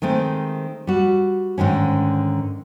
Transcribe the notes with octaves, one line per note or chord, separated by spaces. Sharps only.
D#3 G#3 A3 C4
G3 F#4
G#2 D3 D#3 C#4